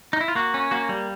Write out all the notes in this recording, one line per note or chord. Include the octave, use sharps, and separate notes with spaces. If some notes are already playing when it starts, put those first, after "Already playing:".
D#4
E4
F4
A#3 F#4
C#4
A#3 F#4
G3